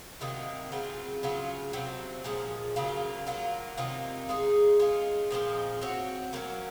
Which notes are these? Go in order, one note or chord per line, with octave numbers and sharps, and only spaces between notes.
C3 D#3 F#3 A#3
C#3 F#3 C4 F4
C#3 F#3 C#4 F4
C3 F#3 C4
A#2 F3 G#3 C#4
C#3 F#3 A#3 F4
F#3 A#3 F4
C3 D#3 A#3 F4
G#3 D#4 G#4
G#3 C#4 F4
A#2 F3 G#3 C4
C4 F#4 C#5
F#3 A#3 C#4